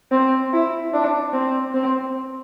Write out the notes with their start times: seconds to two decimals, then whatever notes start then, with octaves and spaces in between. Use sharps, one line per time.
0.11 C4
0.53 E4
0.93 D4
1.33 C4
1.74 C4